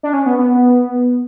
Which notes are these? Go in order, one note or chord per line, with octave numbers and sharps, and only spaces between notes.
D4
C#4
B3
B3